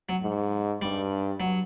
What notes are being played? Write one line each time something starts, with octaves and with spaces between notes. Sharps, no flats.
F#3
G#2
G2 G3
F#3